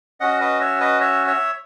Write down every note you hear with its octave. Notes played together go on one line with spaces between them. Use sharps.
C#4 F#4 D#5 F#5
B4 D#5
C#5 E5
B4 D#5
C#5 E5
C#5 E5